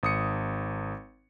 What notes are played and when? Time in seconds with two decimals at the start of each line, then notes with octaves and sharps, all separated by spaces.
0.03 G#1 D#6 C#7